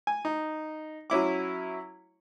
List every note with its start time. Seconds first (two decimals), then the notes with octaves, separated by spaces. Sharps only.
0.07 G#5
0.25 D#4
1.10 F#3 C#4 E4 D6